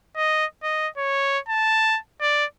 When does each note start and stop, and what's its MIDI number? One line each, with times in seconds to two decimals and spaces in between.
0.16 0.46 75
0.63 0.88 75
0.98 1.39 73
1.48 1.99 81
2.21 2.45 74